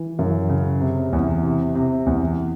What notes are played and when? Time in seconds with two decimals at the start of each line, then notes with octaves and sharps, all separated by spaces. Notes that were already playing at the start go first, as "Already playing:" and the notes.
Already playing: E3
0.19 F#2
0.49 C#3
0.81 C3
1.13 E2
1.43 C3
1.75 C3
2.06 E2